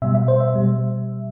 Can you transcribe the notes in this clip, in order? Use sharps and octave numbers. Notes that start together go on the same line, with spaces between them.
B2 G3 E5
E5
C5
E5
B2 G3